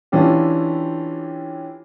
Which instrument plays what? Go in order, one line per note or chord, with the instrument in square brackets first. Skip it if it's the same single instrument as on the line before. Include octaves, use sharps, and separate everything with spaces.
[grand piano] E3 C#4 D4 F4 G4